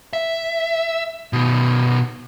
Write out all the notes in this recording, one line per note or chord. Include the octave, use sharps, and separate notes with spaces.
E5
B2 D#3